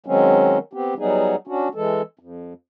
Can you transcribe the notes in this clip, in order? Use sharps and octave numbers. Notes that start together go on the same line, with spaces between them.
D#3 F#3 G#3 C4 C#4
B3 C4 G4
F#3 G3 B3 D#4 G#4
C#4 D4 F#4
E3 G#3 A4
F2